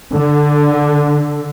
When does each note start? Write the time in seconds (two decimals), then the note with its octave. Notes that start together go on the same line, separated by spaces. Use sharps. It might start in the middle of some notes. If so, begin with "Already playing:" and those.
0.14 D3